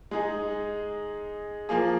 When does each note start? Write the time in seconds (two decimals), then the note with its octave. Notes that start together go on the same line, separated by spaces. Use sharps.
0.11 G#3 D#4 G#4
1.69 F3 A#3 G#4